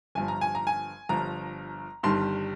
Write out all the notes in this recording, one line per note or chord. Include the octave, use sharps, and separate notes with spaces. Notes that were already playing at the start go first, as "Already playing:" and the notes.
G1 G2 F3 G#5
A#5
G#5
A#5
G#5
G1 G2 F3 A#5
G1 G2 D#3 G3 C6